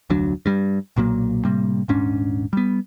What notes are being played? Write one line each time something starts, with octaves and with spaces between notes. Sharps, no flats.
F1 D2 F#3 D4
G2 G3
B1 A#2 F#3 A#3
A2 C3 G3 A#3
D#1 G#2 C#4 D4
G3 B3